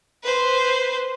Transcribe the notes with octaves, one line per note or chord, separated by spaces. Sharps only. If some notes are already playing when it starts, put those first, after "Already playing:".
B4 C5